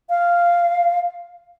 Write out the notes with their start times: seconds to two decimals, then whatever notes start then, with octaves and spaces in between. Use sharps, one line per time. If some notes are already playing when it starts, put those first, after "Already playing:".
0.10 F5